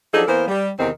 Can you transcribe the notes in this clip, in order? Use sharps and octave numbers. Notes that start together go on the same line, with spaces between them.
F3 F#3 D4 D#4 G#4 A4
E3 A#3 B3 A#4 C5
G3
E2 C3 D#3 C4